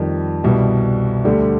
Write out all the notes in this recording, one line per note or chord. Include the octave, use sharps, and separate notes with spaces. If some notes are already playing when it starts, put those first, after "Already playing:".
Already playing: F2 D#3 G3
C2 B2 G3
D2 D3 G3 D4 G4